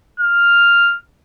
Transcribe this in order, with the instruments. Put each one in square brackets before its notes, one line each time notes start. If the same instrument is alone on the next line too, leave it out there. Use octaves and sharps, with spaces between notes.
[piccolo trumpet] F6